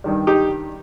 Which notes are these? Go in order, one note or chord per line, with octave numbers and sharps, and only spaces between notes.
G2 D#3 G3
D#4 G4